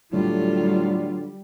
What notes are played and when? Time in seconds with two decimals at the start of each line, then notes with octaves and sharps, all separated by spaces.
0.13 A2 D3 F#3 G3 F4